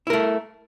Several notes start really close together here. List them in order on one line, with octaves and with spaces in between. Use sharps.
E4 A#4 A3